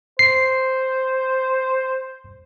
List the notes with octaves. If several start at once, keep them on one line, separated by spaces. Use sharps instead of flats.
C5 C7